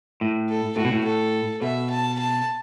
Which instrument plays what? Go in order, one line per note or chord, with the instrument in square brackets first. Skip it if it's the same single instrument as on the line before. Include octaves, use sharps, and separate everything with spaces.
[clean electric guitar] A2
[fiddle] A4
[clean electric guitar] A2 [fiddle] F#4
[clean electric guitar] B2
A2
[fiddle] A4
[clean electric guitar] B2 [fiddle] E5
[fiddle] A5
A5